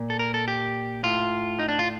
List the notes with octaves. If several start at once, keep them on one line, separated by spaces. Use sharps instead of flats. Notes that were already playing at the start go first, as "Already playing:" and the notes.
Already playing: A#2
A4
A#4
A4
G4
A2 F4
D#4
D4
F4